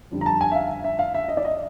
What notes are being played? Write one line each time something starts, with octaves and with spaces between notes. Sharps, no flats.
F2 D3 G3
A#5
A5
G#5
E5
F5
E5
F5
E5
D#5
D5
D#5